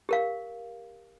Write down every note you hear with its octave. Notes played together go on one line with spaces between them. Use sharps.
G4 A#4 F5